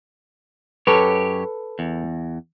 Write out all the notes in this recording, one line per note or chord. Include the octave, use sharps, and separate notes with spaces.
F#2 G4 A4 B4 C#5
E2